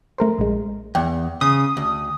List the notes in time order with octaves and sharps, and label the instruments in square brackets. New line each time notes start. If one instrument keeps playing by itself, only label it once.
[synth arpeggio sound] A3 A#4 C5
A#1 G#3
[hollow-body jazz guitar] E2 [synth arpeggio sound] G5 F#6
[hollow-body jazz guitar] C#3 [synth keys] D#6
[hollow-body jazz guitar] D2